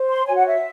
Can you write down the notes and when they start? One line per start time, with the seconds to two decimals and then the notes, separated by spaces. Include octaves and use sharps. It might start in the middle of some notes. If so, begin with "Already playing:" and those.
Already playing: C5
0.08 C6
0.25 F#4 C#5 G#5
0.35 F#5
0.46 E5